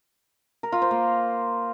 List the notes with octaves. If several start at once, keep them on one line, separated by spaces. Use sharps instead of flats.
A#4
F4
C5
A#3